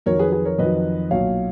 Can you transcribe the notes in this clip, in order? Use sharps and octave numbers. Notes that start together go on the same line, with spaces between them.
F2 D#3 F#3 A#4 C#5
G#4 B4
G#4 B4
A#4 C#5
F2 D#3 F#3 B4 D#5
B1 A#2 F#3 C#5 F5